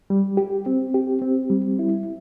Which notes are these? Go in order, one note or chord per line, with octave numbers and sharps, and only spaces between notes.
G3
G4
C4
G4
C4
G3
E4